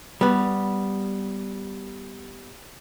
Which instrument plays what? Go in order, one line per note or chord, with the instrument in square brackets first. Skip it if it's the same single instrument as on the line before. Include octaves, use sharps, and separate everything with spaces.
[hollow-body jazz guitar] G3 B3